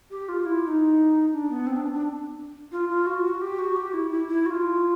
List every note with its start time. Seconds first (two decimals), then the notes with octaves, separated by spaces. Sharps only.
0.11 G4
0.29 F4
0.45 E4
0.63 E4
0.68 D#4
1.33 D4
1.50 B3
1.67 C4
1.76 D4
1.94 D4
2.72 F4
2.89 F4
3.07 F#4
3.24 F#4
3.41 G4
3.59 F#4
3.76 G4
3.93 E4
4.11 E4
4.28 E4
4.46 F#4
4.50 F4